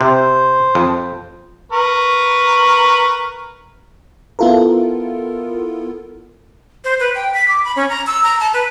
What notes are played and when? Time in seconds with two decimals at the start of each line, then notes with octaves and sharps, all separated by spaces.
0.01 C3 C5
0.75 F2
1.72 A#4 B4 C#6
4.39 B3 E4 F4 A4 A#4
6.84 C5
7.00 B4
7.15 G5
7.34 B6
7.48 D6
7.65 B5
7.76 C#4
7.89 A#5
8.07 E6
8.23 A#5
8.40 A5
8.54 B4